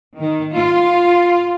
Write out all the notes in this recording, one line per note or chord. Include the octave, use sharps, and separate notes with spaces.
D#3
F4